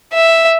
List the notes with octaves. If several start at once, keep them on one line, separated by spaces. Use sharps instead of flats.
E5